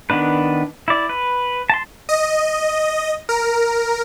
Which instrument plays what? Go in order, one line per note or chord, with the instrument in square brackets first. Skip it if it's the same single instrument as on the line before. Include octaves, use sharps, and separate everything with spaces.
[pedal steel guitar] D#3 B3 D4 B4
E4 D5
B4
A5 C6
[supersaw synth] D#5
A#4